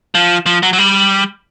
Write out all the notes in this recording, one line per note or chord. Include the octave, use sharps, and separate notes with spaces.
F3
F3
F#3
F#3
G3